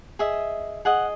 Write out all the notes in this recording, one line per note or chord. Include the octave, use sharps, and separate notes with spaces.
G#4 D#5 E5
G#4 D#5 F#5